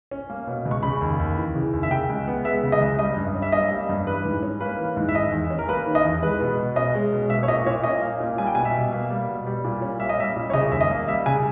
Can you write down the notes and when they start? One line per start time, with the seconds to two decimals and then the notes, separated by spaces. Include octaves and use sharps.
0.11 C#4
0.30 A#3
0.47 B2
0.65 C#2
0.71 C#6
0.83 C#3 B5
1.01 D#2
1.19 D#2
1.37 E3
1.55 C#3
1.73 D#2
1.83 E5
1.91 C#3 G5
2.10 C#2
2.28 B3
2.45 G#3 E5
2.63 C#3
2.72 D#5
2.81 C#2
2.99 G3 D#5
3.17 G2
3.34 C#4
3.42 E5
3.52 A#3 D#5
3.71 G3
3.89 G2
4.06 E3 B4
4.25 G#2
4.43 C#4
4.61 A#3 B4
4.79 E3
4.97 G#2
5.09 E5
5.15 D#3 D#5
5.32 E2
5.50 C#4
5.59 A#4
5.68 A#3 B4
5.86 D#3
5.95 D#5
6.04 E2
6.22 G#3 B4
6.40 B2
6.59 B2
6.76 C#4 D#5
6.95 G#3
7.12 B2
7.30 A#3 E5
7.43 C#5
7.48 A#2 D#5
7.66 A#2 C#5
7.84 C#4 D#5
8.02 A#3
8.20 A#2
8.38 G3 G#5
8.47 G5
8.55 B2 G#5
8.65 E5
8.74 B2
8.92 A#3
9.10 G3
9.28 B2
9.46 G3
9.64 A#2
9.82 C#4
9.99 A#3 E5
10.09 D#5
10.18 G3 E5
10.36 A#2
10.50 C#5
10.53 C#3 D#5
10.71 D#2 E5
10.81 D#5
10.90 A#3
11.07 G3 E5
11.26 C#3 G#5